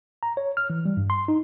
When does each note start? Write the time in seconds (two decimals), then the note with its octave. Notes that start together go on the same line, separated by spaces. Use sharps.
0.23 A#5
0.37 C#5
0.57 F6
0.70 E3
0.85 G3
0.97 G2
1.10 C6
1.28 D#4